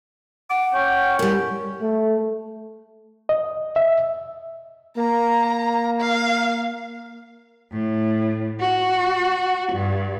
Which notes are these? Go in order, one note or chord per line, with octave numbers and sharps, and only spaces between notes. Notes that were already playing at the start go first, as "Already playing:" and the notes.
F#5 D6
C#4 G5
A2 G3 A#4
A3
D#5
E5
A#3 A#5
F5
A2
F#4
G2